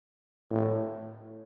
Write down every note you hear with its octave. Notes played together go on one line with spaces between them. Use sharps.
A2